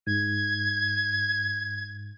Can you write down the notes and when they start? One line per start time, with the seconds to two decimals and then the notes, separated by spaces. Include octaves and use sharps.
0.07 G#2 G#6